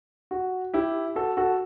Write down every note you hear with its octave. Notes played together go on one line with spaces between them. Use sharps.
F#4
E4 G4
F#4 A4
F#4 A4